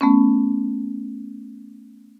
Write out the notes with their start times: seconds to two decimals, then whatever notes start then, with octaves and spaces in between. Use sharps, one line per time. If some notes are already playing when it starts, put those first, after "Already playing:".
0.01 A3 B3 C#4